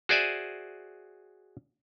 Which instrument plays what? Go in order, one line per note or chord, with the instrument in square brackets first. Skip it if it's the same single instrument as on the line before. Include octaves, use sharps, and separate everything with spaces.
[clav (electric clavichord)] F#4 G#4 C5 D5 E5 G#5